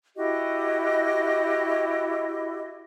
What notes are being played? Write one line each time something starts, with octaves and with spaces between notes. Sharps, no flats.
E4 F#4 G4 D#5